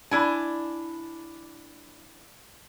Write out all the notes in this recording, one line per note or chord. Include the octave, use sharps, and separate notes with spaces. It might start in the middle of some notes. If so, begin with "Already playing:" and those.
D4 E4 G#5